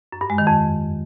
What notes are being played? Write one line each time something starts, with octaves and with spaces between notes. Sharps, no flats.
F#2
G2
G#3
D#3
F2